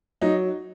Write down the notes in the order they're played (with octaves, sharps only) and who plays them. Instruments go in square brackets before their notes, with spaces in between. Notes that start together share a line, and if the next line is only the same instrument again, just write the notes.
[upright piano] F#3 D#4